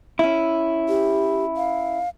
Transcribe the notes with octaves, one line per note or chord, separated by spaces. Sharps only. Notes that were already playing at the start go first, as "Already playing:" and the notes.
C#4 E4
G4
F5